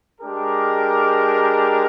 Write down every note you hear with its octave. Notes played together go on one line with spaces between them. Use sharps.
G#3 D4 G4 A#4